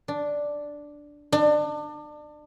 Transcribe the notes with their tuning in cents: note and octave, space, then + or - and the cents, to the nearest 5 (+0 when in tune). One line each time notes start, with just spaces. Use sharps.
D4 +0
D4 +30